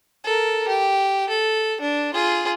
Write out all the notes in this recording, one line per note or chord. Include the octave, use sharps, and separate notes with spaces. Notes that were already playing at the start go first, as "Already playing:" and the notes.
A4 A#4
G4
A4
D4
F4 G#4